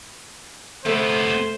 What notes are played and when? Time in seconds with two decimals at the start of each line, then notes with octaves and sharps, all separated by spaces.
0.86 C3 A3 B3 C5